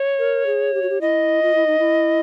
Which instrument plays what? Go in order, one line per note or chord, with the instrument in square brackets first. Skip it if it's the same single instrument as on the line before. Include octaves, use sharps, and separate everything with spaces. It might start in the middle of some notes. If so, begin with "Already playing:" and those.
Already playing: [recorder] C#5
[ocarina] A#4
G#4
G4
F#4
G4
[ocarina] E4 [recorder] D#5
[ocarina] F4
E4
D#4
E4